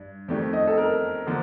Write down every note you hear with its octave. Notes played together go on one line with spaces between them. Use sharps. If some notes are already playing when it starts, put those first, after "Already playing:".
Already playing: G2 D4
F2 D#3 A3 D4 G4
D#5
A4
A#4
D3 F3 A#3